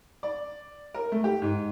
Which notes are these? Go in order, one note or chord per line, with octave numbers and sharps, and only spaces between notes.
D5
A#4
A3
G4
G#2